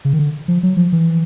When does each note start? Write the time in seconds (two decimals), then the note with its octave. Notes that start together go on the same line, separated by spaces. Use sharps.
0.05 C#3
0.13 D#3
0.19 D3
0.48 F3
0.63 F#3
0.77 F3
0.92 E3